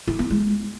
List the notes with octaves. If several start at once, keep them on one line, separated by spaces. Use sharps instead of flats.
E4
B3
G#3